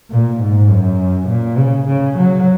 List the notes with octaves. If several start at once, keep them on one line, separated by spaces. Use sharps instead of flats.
A#2
G#2
F#2
A#2
C#3
C#3
F#3